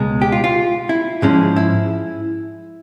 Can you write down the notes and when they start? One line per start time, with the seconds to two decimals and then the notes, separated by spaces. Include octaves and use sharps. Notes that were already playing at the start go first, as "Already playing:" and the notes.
Already playing: C#2 B2 G#3
0.22 G4
0.32 F4
0.44 F4
0.89 E4
1.22 G#2 F3 G#3 C#4
1.56 E4